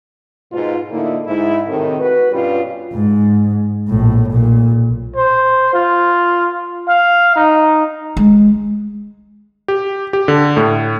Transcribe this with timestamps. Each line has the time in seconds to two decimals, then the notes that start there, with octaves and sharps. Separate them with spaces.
0.52 G#2 B2 F4
0.91 A2 D3 A#3 D#4 E4
1.26 G#2 E4
1.68 A2 C3 D#3
1.99 F#4 B4
2.32 G2 B2 G3 B3 C#4 F4
2.93 G#2
3.88 A#1 A2
4.31 B1 A#2
5.16 C5
5.73 F4
6.88 F5
7.36 D#4
8.17 G#3
9.68 G4
10.13 G4
10.28 D3
10.57 A2